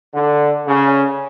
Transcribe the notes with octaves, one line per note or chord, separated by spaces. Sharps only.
D3
C#3